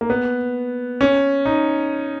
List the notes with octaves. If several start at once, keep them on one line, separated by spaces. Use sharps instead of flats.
A#3
B3
C#4
D#4